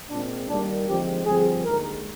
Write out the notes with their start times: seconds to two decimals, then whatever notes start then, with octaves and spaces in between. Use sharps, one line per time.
0.10 A#2 G#3 C4 D4
0.49 D#2 D#3 G3 A#3 D4
0.87 D#2 D3 F3 G#3 C4 G4
1.25 G2 D3 F3 C4 G#4
1.64 D#2 D3 G#3 A#4